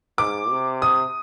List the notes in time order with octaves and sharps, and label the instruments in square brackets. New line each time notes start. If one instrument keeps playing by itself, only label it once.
[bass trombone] G#2 [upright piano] D6
[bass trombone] C3
[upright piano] D#6